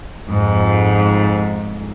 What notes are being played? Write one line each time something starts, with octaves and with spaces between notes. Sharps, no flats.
F2 G#2